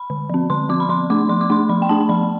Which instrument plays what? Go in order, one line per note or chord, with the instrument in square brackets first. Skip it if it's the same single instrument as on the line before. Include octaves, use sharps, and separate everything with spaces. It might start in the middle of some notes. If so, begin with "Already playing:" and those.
Already playing: [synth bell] B5
D3
F3 C4
D3 C6
F3 C4 D6
B5
F3 C6
A3 D4 D6
F3 C6
D6
A3 D4 C6
F3 B5
G5
A3 D4 A5
F3 B5